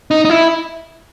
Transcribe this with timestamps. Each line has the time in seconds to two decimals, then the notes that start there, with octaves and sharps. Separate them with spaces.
0.11 D#4
0.25 D#4
0.30 E4